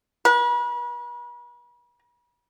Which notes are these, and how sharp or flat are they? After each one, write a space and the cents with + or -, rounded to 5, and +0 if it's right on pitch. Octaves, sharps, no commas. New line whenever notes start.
B4 -40